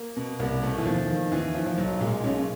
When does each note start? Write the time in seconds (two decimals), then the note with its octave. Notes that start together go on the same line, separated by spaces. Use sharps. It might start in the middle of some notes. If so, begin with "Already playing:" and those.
Already playing: A#3
0.16 B2
0.39 C2 A#3
0.62 B2 A3
0.78 E3
0.85 D#2 F3
1.08 D#3
1.31 D#2 E3
1.54 D#3 F3
1.66 F3
1.78 B1 F#3
2.01 A#2 G#3
2.24 B1 C#4